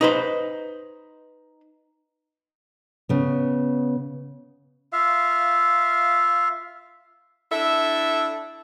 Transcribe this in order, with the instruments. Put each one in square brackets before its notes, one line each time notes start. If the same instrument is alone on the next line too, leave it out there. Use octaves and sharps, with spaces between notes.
[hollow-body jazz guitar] D#4 B4 C5
[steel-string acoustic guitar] C#3 B3
[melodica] F4 E5 F5
[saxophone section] D4 E4 A4 E5